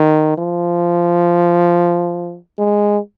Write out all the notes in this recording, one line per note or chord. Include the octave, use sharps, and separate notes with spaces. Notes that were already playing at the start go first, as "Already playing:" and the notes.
Already playing: D#3
F3
G#3